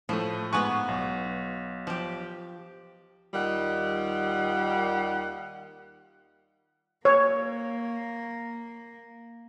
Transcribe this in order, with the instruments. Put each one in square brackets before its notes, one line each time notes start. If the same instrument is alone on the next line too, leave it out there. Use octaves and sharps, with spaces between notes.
[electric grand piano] A2 A3 [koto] F3
[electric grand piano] G#2 G#5 C#6 [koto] B3 B4
[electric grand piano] B1
[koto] F3 G4
[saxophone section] D#2 D#3 G3 F4 F#5
[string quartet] A#3 [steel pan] C#5